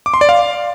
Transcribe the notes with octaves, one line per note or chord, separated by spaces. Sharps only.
D6
C6
D5
F5